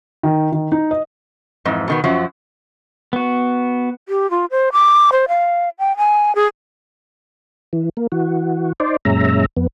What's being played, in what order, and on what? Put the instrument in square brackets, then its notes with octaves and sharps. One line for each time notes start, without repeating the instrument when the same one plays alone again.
[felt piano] D#3
D#3
D#4
D#5
[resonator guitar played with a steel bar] F2 G#2 E3
B2 D#3 B3
F#2 F3 F#3 F#4
[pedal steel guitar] B3 F#4
[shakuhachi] G4
F4
C5
D6
C5
F5
G5
G#5
G#4
[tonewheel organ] E3
A#3
E3 F#4
D#4 C5 D5
F#2 A#2 G#3 C#4 E5 A#5
F2 B3